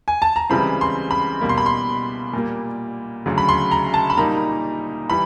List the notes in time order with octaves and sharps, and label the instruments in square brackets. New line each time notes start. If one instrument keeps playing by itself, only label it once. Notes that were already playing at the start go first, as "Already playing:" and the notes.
[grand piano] G#5
A5
A#5
C#2 C#3 E3 G3 C4 B5
C6
B5
B2 G3 A#3
C6
B5
C6
A#2 G3 A#3
D2 C#3 F#3
B5
C6
A#5
A5
B5
A#2 G3 A#3 D#4 A#5
E3 G3 B5